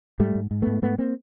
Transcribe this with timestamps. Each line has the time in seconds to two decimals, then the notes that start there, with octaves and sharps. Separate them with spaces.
0.20 G#2 G3 A3
0.35 G#2
0.51 G#2
0.62 G#2 A3 B3
0.82 G#2 A3 B3
0.98 A#3 C4